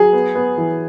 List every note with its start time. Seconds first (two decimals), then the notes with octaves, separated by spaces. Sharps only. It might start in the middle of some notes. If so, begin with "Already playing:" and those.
Already playing: F#3 G#4
0.13 B3
0.35 B3
0.58 E3